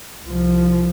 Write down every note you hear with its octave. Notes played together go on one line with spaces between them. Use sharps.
C2 F3